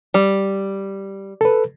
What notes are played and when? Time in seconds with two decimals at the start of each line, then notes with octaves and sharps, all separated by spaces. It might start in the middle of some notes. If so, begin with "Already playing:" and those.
0.14 G3
1.41 A4 B4